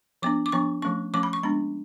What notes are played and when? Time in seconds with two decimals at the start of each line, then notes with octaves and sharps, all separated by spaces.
0.22 F3 B3 D4 D6
0.46 D6
0.52 F3 B3 D4 C#6
0.82 F3 A3 C#4 C#6
1.14 F3 A3 C#4 D6
1.23 B5
1.33 C#6
1.43 G#3 B3 D4 B5